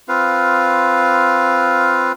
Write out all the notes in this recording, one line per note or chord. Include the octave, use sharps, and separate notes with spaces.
C4 F4 B4 F5